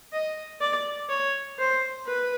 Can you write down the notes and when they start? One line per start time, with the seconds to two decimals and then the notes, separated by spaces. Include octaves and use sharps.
0.13 D#5
0.61 D5
1.09 C#5
1.59 C5
2.07 B4